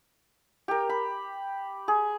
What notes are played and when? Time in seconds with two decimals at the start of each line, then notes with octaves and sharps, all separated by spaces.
0.68 G4 A#4
0.89 B5
1.88 G#4